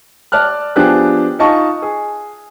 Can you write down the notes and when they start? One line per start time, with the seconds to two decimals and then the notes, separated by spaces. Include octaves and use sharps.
0.32 D5 A5 F6 F#6
0.76 F3 B3 D4 G4 G#4 F#6
1.39 D#4 F4 D#5 A5 C#6
1.82 G#4